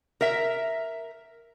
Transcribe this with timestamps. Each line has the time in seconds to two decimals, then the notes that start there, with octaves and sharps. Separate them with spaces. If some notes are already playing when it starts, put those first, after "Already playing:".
0.21 A#4 E5